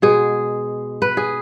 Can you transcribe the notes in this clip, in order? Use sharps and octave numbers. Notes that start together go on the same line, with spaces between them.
B2 G#3 G#4
B4
G#4